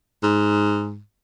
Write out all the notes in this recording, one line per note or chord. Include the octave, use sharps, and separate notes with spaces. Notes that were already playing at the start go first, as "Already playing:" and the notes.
G#2